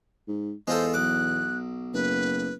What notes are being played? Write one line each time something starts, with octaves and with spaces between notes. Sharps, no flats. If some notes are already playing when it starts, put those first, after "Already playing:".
G#2
E2 G#3 F4 A4 C5
B1 D6 F#6
F#1 B4